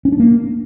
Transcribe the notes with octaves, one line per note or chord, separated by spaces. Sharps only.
C#4
D4
A#3